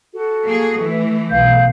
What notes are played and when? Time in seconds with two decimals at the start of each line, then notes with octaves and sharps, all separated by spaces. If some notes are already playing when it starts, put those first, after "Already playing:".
0.13 F#4 A4
0.44 A#3 G#4
0.80 E3 A3
1.29 B1 F5 G6